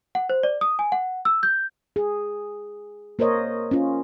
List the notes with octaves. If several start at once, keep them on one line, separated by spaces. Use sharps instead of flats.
F#5
C5
D5
D#6
G#5
F#5
E6
G6
G#4
A#3 A#4 C5 C#5 D#5
C#4 F4